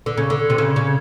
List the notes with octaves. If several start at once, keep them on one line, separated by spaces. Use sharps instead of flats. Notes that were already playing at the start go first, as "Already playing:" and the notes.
D3
C#3
D3
C3
C#3
C#3